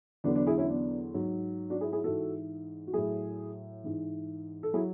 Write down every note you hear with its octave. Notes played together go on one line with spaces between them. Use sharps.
E2 D3 F#3 B3 D4
B3 D4
E4 G#4
C#4 E4
B3 D4
G#2 F#3
D4 F#4
E4 G#4
E4 G#4
G#2 E3 F#4 A4
F#4
A2 F#3 E4 G#4
G#2 E3
A4
F#3 E4 G#4